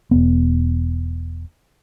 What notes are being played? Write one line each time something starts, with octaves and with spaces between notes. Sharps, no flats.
E1 B3